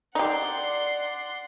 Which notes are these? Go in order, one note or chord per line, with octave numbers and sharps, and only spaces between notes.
D#4 G4 D5 F#5 C6